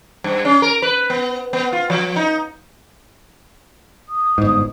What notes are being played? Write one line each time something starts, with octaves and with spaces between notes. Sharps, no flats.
G2
C#4
A#4
B4
B3
B3
F4
F3
D#4
D#6
G1 G#2